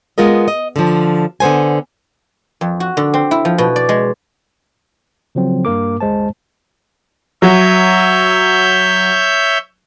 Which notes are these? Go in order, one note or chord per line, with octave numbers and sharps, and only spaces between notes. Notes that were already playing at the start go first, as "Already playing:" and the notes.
G#3 B3 F4 A#4 D#5
D#5
D3 F3
D3 B3 C5 G#5
F2
F#4
D3
C4
E4
F3
B2
D5
G#3
C#3 F3 F#3 C4
G2 A#3 A#4 D6
G1 D#2 G#3 C5 A5
F#3 C#5 E5 G6